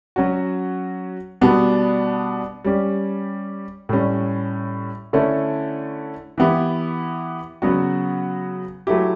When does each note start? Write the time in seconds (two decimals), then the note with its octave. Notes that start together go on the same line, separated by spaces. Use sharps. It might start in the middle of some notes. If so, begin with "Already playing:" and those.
0.16 F#3 C#4 F#4
1.41 B2 G3 B3 D4
2.65 G3 C#4 G4
3.89 A2 G3 C#4
5.13 D3 A3 C#4 E4
6.38 E3 B3 E4 G4
7.62 C#3 F#3 B3 F#4
8.87 F#3 A3 E4 G4